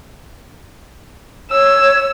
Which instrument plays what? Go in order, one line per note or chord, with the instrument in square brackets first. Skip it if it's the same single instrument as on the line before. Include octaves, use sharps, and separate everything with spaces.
[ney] C#5 [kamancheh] E6